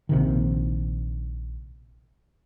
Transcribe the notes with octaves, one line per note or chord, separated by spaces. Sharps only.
A#1 C3 D#3